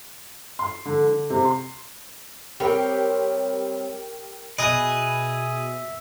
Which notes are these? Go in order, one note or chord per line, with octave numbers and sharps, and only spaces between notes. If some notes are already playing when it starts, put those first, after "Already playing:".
C6
D3
D3
C3
C6
G3 C4 G4 A#4 C#5
B2 G#4 B4 D#5 E5 D#6